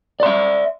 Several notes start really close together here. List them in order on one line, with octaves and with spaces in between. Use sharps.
D5 C6 E5